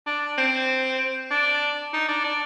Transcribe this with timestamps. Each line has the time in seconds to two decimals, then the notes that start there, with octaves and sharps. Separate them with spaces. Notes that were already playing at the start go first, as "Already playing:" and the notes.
0.06 D4
0.38 C4
1.30 D4
1.93 D#4
2.08 D4
2.24 D4